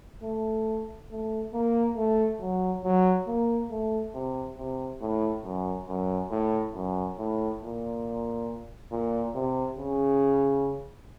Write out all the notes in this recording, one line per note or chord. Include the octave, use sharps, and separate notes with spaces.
A3
A3
A#3
A3
F#3
F#3
A#3
A3
C3
C3
A2
F#2
F#2
A2
F#2
A2
A#2
A#2
C3
C#3